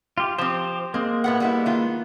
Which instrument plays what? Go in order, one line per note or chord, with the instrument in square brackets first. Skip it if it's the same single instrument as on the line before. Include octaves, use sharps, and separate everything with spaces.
[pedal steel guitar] F4 G4
[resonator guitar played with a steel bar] F3 C4 [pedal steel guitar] G4 C5
[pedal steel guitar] G#3 A#3 [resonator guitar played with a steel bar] C4
[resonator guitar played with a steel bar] A2 B3 F#5
G3 B3 E4
D#3 B3 F4